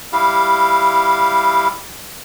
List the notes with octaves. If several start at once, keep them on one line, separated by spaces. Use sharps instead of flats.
G3 E4 G4 F5